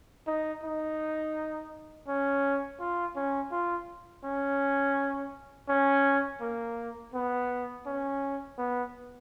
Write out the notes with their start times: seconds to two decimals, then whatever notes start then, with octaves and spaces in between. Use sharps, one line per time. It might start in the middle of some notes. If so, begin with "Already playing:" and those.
0.27 D#4
0.64 D#4
2.08 C#4
2.80 F4
3.16 C#4
3.52 F4
4.24 C#4
5.69 C#4
6.41 A#3
7.14 B3
7.86 C#4
8.58 B3